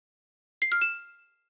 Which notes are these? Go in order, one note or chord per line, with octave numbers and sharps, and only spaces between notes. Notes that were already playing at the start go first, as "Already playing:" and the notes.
C7
F6
E7